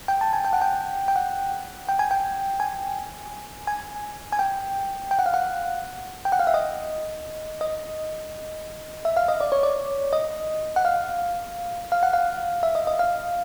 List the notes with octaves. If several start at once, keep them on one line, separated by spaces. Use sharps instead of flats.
G5
A5
G#5
G5
F#5
G5
G5
F#5
G5
G#5
G5
G#5
G#5
G#5
G5
G5
F#5
F5
F#5
G5
F#5
F5
E5
D#5
D#5
E5
F5
D#5
D5
C#5
D5
D#5
F#5
F5
F5
F#5
F5
E5
D#5
D#5
F5